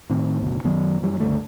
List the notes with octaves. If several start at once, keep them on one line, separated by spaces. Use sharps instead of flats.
A2 D#3 C4
F#1 D2 B2
F#2 D#3 F#3 B3
F#2 E3 G3
C#2 G2 D3 A3